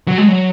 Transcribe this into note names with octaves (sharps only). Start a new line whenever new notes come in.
F#3
G#3
F#3